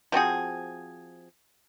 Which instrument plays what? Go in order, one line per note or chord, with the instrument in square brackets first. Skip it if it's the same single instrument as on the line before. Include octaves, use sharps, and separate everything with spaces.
[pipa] F3 C4 F#4 G#4